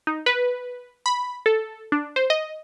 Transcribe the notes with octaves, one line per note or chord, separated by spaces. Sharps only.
D#4
B4
B5
A4
D4
C5
D#5